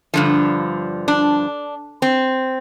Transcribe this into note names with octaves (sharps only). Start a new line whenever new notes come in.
G2 D3 F3
D4
C4